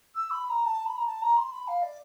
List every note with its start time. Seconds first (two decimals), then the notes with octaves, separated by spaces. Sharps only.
0.15 E6
0.30 B5
0.45 B5
0.49 A#5
0.65 A5
0.86 B5
0.97 A#5
1.06 A5
1.22 A#5
1.37 C6
1.52 B5
1.67 F5
1.82 D5